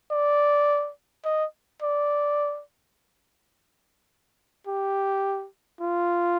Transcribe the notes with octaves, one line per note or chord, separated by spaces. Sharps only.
D5
D#5
D5
G4
F4